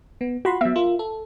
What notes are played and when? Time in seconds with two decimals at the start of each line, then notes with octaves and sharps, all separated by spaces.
0.21 B3
0.45 F4 F#4 B5 C6
0.61 F#3 B3 E5
0.76 F4 A#4
0.99 A4